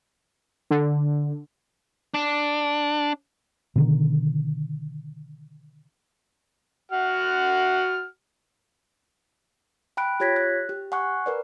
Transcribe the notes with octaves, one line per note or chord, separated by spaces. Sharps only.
D3
D4
B2 D3 D#3
F#4 F#5 F6
G5 B5 F#6 D7
F4 G4 C#5 G#6 A#6 B6
F#6
G4
F#5 G#5 C#6 F#6
A#4 B4 D5